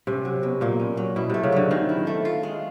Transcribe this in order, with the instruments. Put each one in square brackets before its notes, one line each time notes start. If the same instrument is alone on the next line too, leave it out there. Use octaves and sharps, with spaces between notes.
[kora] C3 [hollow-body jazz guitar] C#4
[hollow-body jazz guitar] F#3
B2
[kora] A#2 [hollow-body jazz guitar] A#3
[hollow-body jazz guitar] C#4
F#3
[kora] B2 [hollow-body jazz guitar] E4
[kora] C3 [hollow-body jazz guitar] A3
[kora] C#3
[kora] D3 [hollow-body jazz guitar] F#3
[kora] D#3 [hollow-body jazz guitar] C4
[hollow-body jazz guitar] E4
A3
F4
G#3